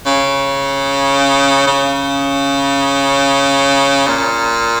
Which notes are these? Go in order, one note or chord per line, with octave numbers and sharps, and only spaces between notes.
C#3
C#3
A#2